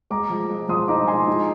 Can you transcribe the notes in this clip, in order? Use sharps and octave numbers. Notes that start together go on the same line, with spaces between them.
G#3 A#5 D6
F3
G#3
F3 C6 D#6
D#4 A#5 D6
G#3 G#5 C6
D#4